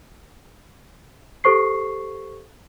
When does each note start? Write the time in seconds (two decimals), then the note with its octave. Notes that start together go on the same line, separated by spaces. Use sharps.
1.44 G4 A4 C5 C#6 C7